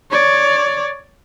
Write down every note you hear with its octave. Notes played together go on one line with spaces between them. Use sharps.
C#5 D5